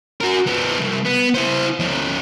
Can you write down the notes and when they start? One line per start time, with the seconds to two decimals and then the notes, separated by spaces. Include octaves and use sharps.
0.21 F#4 A#4
0.47 F3 B3
0.79 C2
1.05 B3
1.34 E4 C5
1.80 F3 C#4